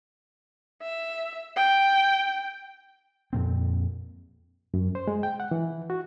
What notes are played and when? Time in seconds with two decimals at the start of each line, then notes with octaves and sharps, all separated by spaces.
0.82 E5
1.56 G5
3.33 F2 A#2 C4
4.74 F#2
4.95 C5
5.08 G#3
5.23 G5
5.40 F#5
5.51 E3
5.90 F#4